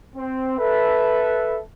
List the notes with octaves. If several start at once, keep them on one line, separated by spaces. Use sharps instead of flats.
C4
A4 B4 E5